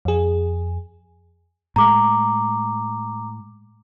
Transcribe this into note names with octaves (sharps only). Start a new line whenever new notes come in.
F2 G#4
A2 G#3 A#5 D6